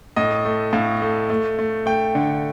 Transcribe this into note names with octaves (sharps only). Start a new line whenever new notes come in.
A2 D#5
A3
A2 F5
A3
A3
A3
A3 G5
D3